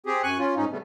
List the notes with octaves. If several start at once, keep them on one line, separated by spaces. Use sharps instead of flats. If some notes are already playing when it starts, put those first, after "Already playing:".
C4 G4 G#4
F#2 G#5 C#6 F#6
C#4 F4
G#2 C#4 D#4
C#3 G3 A3 B3